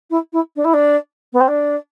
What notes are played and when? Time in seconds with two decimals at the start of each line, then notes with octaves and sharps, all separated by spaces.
0.10 E4
0.33 E4
0.56 D4
0.64 E4
0.74 D4
1.33 B3
1.40 C4
1.48 D4